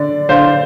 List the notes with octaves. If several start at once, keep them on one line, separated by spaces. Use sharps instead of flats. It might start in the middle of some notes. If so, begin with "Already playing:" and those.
Already playing: D3 D5
D3 C5 F5